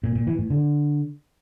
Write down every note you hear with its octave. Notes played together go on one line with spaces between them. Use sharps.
A#2
A#2
E3
A2
D3